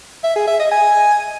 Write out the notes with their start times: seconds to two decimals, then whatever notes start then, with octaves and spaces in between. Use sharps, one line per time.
0.24 E5
0.36 G#4
0.48 E5
0.59 D#5
0.71 G#5